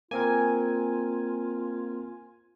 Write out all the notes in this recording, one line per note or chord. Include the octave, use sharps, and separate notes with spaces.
A#3 C4 F4 A#4 G#5